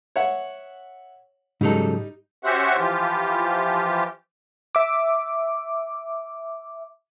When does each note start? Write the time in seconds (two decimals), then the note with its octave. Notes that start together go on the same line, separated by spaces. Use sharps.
0.16 C#5 E5 F#5
1.61 G#2 C#3 F#3 G3 D#4 A4
2.43 C#4 F#4 G4 C5 E5 F#5
2.77 E3 F3 F4 G4
4.75 E5 D6